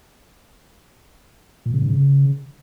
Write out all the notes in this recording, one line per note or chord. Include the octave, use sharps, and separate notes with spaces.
A#2
C#3
G#2
C#3